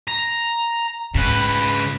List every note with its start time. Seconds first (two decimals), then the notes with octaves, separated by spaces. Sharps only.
0.08 A#5
1.15 G#2 C#3 B4